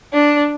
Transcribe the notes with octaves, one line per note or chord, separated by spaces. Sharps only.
D4